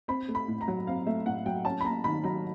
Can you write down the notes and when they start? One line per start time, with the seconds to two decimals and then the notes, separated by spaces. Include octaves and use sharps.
0.08 C4 B5
0.28 A3
0.35 B5
0.48 A2
0.61 A#5
0.68 F#3
0.87 C4 F5
1.06 A3 E5
1.26 A2 F#5
1.46 F#3 G5
1.65 C#4 A5
1.80 B5
1.84 A#3 A#5
2.04 D#3 B5
2.24 F#3 A#5